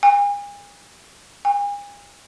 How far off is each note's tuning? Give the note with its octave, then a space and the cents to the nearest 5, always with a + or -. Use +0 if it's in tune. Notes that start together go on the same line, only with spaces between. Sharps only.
G#5 -40
G#5 -40